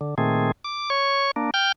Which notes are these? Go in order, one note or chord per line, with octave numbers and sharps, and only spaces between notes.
D3
A#2 D#3 A3 C4 G#4
D6
C#5 C#6
A#3 D4
G5 F6 G6